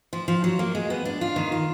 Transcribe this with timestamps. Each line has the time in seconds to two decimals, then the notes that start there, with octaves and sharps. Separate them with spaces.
0.13 F3
0.28 F3
0.44 F#3
0.59 A#3
0.75 G#3
0.90 B3
1.05 D4
1.21 F4
1.36 D#3
1.52 F4